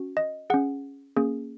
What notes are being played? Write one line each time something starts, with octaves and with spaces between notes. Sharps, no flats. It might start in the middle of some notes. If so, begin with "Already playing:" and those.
Already playing: C#4 F#4
D#5
C#4 G#4 F#5
A#3 C#4 G#4